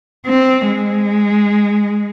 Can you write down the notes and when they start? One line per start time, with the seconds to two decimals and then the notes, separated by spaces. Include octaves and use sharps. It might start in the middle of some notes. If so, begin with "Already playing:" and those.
0.26 C4
0.69 G#3